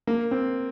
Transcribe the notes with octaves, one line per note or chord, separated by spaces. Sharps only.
A#3
C4